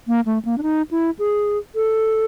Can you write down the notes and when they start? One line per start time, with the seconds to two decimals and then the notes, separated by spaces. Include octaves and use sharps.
0.08 A#3
0.26 A3
0.45 A#3
0.58 D4
0.63 D#4
0.91 E4
1.19 G#4
1.75 A4